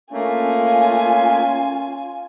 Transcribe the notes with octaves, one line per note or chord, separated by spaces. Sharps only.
A3 A#3 C#4 F4 G#5